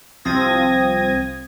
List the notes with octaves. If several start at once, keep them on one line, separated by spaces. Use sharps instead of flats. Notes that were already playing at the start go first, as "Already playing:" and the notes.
C2 F3 C4 D#6 G#6 A#6